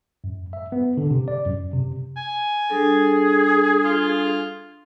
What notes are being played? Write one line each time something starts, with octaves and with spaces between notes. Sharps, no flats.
F#2
E5
B3
D3
C3
D5
F#2
C3
G#5
G3 D4 G#4 A4
F4